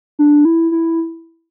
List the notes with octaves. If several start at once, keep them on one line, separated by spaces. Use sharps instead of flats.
D4
E4
E4